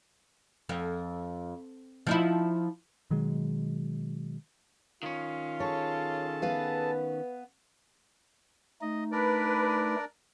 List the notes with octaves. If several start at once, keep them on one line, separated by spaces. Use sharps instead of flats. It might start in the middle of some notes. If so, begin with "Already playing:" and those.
F2
F3 D#4 E4
B2 D#3 F#3 G#3
D#3 C#4 F4
G#4 A4 C#5 A5
B3 B4 F5
A3 D#4 D#5
D4 A#4 B4 D5